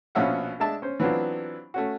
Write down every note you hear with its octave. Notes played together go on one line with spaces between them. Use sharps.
A#1 B2 F3 C#4 E5 F#5
G#3 D4 E5 A5
C#4 C5
E3 F#3 B3 C4 D4 F4
A3 C#4 F#4